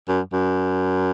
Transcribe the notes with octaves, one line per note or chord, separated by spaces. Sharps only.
F#2
F#2